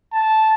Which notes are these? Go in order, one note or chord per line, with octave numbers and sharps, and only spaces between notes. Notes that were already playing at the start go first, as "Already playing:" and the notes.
A5